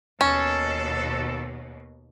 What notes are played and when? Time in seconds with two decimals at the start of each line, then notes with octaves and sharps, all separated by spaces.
0.21 D#2 B2 C#4 A4